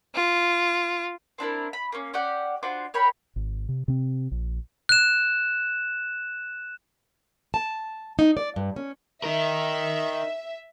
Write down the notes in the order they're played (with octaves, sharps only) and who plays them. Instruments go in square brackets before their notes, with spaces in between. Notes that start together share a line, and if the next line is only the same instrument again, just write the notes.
[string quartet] F4
[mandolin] C4 D4 E4 A#4
B5
A#3 C#4
C#4 G4 D5 F#5
D4 F4 F#4 C5
A#4 C#5 G5 B5
[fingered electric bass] G#1
C3
C3 C4
A#1
[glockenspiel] F#6 E7
[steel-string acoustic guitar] A5
D#4
D5
G2
C#4
[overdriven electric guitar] D#4 A#4 [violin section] E5